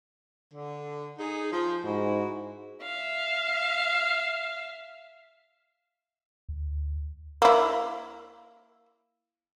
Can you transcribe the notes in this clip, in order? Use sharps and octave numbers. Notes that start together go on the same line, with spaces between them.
D3
D#4 G#4
F3
G#2 E4 F#4
E5 F5
D2
A#3 E4